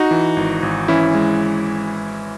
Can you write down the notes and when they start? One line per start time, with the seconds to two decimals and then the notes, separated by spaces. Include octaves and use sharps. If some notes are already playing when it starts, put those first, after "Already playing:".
Already playing: D#4 F#4
0.11 E3
0.37 G#1
0.63 G#1
0.88 E3 C#4 E4
1.15 G#3